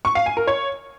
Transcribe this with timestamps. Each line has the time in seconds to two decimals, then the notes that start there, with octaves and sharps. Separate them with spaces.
0.05 C#6
0.15 F5
0.26 G#5
0.37 A#4
0.47 C#5